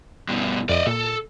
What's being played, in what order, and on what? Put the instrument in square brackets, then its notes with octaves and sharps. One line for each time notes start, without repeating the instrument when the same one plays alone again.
[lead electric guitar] G2 B2
[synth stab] F2 D7 [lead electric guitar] D5 D#5
[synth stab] A#2 [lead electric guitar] A4